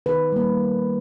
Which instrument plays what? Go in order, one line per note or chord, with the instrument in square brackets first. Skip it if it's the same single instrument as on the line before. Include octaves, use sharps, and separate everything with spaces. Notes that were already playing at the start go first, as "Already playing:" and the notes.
[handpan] D#3 B4
G3 A#3